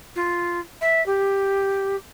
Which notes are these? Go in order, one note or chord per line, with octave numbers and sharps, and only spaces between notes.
F4
E5
G4